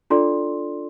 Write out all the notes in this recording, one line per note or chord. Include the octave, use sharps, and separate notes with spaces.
D4 F4 A4 D5 C6